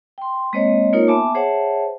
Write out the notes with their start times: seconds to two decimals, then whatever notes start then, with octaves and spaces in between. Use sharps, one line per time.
0.18 G5 C6
0.53 G#3 A#3 C4 C5 C#5 D#5
0.93 A#3 D#4 F4 A#4 C#5
1.08 B3 E5 G#5 A5 D6
1.35 G#4 C5 C#5 E5 F#5 A5